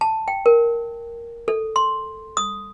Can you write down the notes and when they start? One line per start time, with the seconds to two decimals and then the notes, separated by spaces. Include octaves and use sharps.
0.01 A5
0.28 G5
0.46 A#4
1.48 A4
1.76 C6
2.37 D#6